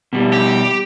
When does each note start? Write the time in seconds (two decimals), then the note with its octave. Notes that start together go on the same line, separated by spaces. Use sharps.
0.13 B2 G3
0.33 G4